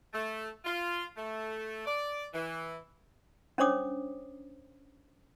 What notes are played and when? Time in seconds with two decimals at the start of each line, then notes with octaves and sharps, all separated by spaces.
0.14 A3
0.65 F4
1.17 A3
1.87 D5
2.34 E3
3.58 C#4 D4 C5 C#5 D6 D#6